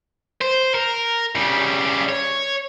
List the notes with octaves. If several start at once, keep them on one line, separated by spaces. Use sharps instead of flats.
C5
A#4
C#3 G3
C#5